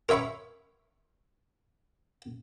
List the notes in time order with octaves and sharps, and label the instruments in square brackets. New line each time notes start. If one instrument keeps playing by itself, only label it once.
[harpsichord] A#4 C#5 E5 B5 C#6